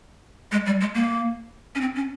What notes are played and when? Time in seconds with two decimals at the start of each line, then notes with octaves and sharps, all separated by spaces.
0.52 G#3
0.66 G3
0.81 G#3
0.95 A#3
1.75 C#4
1.81 C4
1.95 C#4